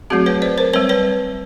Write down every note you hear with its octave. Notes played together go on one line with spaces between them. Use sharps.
F#3 A3 C4 F#4 G#4
B4 C#5
C5 D5
A#4 C5
G3 C4 B4 C#5
B4 C#5